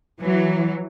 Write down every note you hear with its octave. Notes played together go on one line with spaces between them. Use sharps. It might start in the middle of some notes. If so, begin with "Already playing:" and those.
E3 F#3